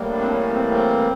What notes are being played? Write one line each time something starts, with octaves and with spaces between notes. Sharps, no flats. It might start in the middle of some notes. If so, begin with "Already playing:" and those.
Already playing: A2 E3 G3 A#3
D4
C4
C#4
C4
C4